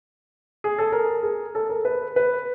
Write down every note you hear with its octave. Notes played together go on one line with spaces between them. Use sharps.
G#4
A4
A#4
G#4
A4
A#4
B4
B4